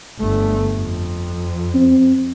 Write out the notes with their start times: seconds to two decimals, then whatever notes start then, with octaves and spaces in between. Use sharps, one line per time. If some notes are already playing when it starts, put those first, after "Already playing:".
0.20 G1 A3
0.73 F2
1.75 C4